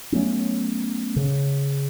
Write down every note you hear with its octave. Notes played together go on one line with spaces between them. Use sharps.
F#3 A3 B3 C#4
C#3